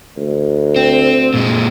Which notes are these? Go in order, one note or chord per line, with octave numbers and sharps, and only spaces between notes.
D2
C4
A#2 G#3